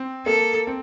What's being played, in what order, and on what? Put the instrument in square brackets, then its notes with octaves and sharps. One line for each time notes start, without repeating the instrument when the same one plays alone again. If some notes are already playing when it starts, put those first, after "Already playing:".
Already playing: [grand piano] C4
[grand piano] A#3 [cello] A4
[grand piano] C4